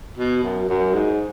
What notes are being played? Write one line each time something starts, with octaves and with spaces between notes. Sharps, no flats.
B2
F#2
F#2
G#2